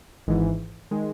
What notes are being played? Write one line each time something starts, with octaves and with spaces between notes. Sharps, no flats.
G#1 G#2 E3
D#3 G#3